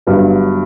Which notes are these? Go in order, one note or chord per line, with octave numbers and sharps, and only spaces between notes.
G1 G2 F#3